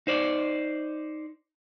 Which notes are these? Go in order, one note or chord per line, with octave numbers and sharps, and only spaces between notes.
D#4 C5 D5